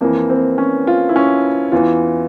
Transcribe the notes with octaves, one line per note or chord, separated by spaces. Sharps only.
F2 E3 A#3
C4
C#4
F4
E4
C#4
E2 E3 F4